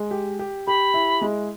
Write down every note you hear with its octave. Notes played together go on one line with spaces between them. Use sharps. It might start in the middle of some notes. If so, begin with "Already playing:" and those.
Already playing: G#3
G4
G4
G4 B5
E4
G#3